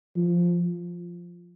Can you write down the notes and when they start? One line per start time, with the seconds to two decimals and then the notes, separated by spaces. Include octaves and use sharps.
0.16 F3